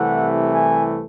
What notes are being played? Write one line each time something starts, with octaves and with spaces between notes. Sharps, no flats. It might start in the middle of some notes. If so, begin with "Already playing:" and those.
Already playing: C2 C3 E3 A3 F#5
G#5